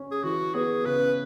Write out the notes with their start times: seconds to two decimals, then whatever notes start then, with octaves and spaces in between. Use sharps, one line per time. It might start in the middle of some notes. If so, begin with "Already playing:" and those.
Already playing: C#4
0.11 G#4
0.23 E3 F#4
0.54 B3 G#4
0.85 C#3 B4